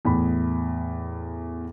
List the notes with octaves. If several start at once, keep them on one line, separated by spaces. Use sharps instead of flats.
E2 A2 B5